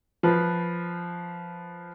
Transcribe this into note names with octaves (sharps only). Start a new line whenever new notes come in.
F3 B4 C5